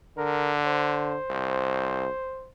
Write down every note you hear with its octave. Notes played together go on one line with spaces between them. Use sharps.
D3 A#4
C5
C2